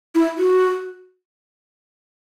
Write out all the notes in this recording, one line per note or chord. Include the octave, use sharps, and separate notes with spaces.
E4
F#4